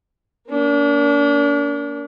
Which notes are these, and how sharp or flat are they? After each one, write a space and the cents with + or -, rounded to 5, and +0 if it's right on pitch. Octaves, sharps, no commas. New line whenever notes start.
A#3 +10 D4 -40